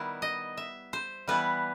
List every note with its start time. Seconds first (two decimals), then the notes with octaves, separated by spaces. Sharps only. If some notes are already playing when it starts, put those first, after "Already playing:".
Already playing: D#3 G3 B3 E4
0.22 D#5
0.57 E5
0.93 C5
1.28 E3 G3 B3 E4 B4